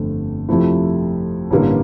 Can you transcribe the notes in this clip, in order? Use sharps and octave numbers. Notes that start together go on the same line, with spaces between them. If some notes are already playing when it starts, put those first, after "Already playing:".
Already playing: G1 F2 D3 A3 C4
F2 C3 F3 A3 E4
A1 G2 D3 G3 A#3